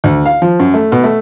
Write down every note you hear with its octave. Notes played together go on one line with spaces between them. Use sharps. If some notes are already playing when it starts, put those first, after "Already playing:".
D2
F5
F3
F#2
A3
B2
A3